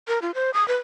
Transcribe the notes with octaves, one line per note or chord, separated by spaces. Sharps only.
A#4
F4
C5
D#6
B4